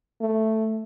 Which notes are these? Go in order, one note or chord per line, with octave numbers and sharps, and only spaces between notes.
A3